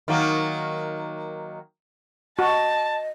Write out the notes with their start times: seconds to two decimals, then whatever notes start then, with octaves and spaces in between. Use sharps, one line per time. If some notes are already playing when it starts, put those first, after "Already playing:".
0.08 D#3 F#3 A#3
2.39 F#4 D#5 A5